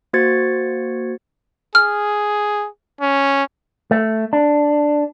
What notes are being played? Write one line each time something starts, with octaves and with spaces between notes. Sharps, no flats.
A#3 F#4 C5 G#6 A6 C#7
G#4 F6
C#4
A3
D4